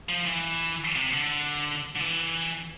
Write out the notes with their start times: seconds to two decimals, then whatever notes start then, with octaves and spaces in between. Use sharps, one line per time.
0.09 F3
0.26 E3
0.95 C3
1.13 D3
1.96 D3
2.00 E3